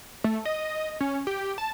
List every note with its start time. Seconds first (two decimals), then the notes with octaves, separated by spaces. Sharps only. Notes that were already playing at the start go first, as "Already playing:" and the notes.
0.24 A3
0.45 D#5
1.01 C#4
1.27 G4
1.58 A5